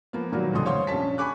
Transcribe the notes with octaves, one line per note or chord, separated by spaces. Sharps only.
F3 A#3 B3
A#2 D#3 F#3 G3 A#3
D#1 A1 A2 D3 C6 D#6
C5 C#5 F5 C6
A#1 C3 C#4 A5 B6
G#5 B5 C#6 D6 F#6